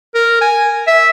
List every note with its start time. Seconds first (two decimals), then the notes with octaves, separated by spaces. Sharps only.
0.15 A#4
0.41 G#5
0.87 E5